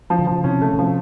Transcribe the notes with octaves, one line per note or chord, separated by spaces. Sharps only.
F3
D3
C#3 F3
C3 C#4
A3
C#3
C3 F3